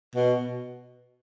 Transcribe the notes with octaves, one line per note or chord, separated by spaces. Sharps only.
B2